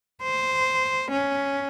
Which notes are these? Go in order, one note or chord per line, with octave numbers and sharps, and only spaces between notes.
C5
C#4